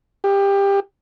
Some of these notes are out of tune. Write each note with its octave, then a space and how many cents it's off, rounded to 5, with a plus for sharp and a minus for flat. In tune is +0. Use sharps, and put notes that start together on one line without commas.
G4 +20